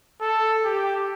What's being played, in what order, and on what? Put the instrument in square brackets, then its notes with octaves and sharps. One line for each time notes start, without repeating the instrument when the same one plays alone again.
[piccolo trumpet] A4
G4